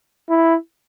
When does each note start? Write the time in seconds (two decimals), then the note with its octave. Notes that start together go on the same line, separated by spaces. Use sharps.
0.29 E4